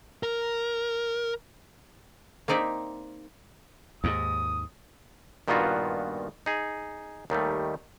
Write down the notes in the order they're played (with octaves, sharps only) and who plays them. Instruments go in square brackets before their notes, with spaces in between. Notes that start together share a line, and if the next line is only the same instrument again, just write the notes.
[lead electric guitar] A#4
[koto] A#3 C4 D#4 D5 E5
[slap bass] D#2 G#2 [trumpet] D#6
[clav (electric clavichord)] G2 A#2 D#3 B3 F4 F#4
D#4 G#4
D#2 D#3 G3 A3